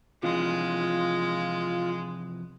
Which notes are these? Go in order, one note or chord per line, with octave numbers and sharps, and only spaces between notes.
C3 E3 F3 G#3 F4